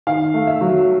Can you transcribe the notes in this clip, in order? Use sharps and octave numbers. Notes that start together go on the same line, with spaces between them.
D#3 F5
A3
E5
F#3